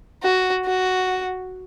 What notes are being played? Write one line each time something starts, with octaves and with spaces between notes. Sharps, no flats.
F#4
F#4